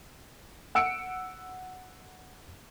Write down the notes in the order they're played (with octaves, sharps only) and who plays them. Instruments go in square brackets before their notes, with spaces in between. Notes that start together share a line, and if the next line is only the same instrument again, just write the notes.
[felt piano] F#5 E6 C#7 D7